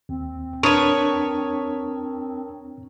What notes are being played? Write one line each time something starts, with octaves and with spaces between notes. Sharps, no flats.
D#2 C4
E2 D4 A#4 B4 C#5 A5 D#6